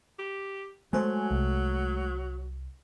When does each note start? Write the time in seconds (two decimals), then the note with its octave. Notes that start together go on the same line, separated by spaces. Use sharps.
0.19 G4
0.93 F#3 G#3 A3 C5 G#5
1.31 C2